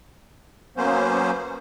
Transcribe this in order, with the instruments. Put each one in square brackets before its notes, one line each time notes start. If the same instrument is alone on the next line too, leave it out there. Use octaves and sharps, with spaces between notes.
[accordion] F#3 A#3 B3 C#4 C5